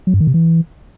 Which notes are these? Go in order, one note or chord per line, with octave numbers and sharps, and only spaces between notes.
F#3
G2
D#3
C3
E3